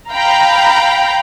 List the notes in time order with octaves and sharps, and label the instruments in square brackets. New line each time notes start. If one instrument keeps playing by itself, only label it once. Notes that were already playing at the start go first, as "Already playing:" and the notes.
[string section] F5 G5 A#5 B5